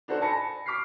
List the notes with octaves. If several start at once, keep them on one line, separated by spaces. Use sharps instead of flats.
D4 D#4 F#4 A4 C5
G#5 A5 B5 A#6 C#7
D6 F6 B6 C7